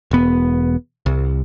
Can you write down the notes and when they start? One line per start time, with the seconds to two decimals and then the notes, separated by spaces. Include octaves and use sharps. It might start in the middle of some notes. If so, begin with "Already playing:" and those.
0.11 E1 B3
1.06 C2